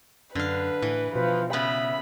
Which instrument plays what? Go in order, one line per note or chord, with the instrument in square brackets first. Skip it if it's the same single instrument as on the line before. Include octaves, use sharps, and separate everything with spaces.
[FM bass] F#2 [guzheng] D3 F5 [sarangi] B4
[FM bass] A2 [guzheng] E3
[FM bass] B2 [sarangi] F3 [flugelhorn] B4
[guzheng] C#3 B3 [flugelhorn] E5 [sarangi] B5